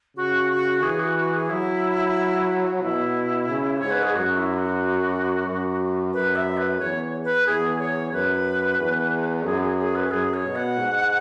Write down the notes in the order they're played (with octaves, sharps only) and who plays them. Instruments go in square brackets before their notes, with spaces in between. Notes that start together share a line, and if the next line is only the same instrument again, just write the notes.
[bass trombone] C#3 [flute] F#4
[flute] F#4
[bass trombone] E3 [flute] G#4
[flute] F#4
F#4
G#4
[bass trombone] F#3 [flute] E4
[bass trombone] B2 [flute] E4
[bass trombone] C#3
[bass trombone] G#2 [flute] C#5
[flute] B4
G#4
[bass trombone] F#2 [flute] F#4
[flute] E4
F#4
[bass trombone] F#2
[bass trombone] F#2 [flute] B4
[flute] E5
B4
[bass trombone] E2 [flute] C#5
[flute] B4
[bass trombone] E2 [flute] G#4
[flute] C#5
[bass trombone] F#2 [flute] B4
[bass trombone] E2
[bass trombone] F#2 [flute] G#4
[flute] G#4
G#4
B4
[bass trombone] F#2 [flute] G#4
[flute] C#5
[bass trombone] B2
[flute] F#5
[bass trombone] G#2